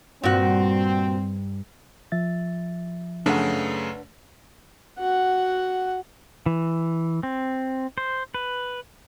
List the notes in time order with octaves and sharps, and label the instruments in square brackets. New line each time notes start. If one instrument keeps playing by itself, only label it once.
[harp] G2 [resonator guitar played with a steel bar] A#2 F#4 [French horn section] C4
[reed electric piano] F3 E5 A6
[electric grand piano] F#2 C#3 A3 [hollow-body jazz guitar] D4 B4 F#5
[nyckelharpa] F#4 F#5
[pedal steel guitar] E3
C4
C5
B4